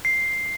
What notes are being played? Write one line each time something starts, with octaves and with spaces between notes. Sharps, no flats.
C7